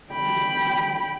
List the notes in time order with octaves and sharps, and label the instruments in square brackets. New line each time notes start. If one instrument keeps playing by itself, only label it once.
[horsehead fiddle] G5 B5